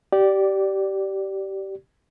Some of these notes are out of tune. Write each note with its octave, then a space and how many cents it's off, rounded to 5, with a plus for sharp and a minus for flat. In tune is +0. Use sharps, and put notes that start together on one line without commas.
G4 -20 D5 +0